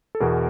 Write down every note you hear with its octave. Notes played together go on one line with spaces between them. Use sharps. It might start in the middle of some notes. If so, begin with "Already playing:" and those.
A4
E2 B2 G#4 A#4